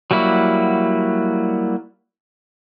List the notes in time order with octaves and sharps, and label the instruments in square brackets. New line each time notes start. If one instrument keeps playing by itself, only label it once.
[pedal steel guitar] F#3 G3 A#3 E4 F#4